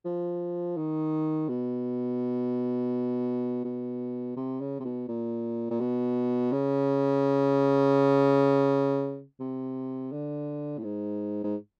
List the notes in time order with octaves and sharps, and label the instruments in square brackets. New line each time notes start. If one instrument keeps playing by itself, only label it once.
[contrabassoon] F3
D#3
B2
B2
C3
C#3
C3
B2
A#2
A#2
B2
C#3
C3
D3
A2
G#2
G#2